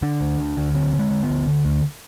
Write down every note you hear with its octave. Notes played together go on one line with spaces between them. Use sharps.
D3 D4
D2
D2
D2
D3 C4
D3
G#3
D3
B3
D2
D3
D2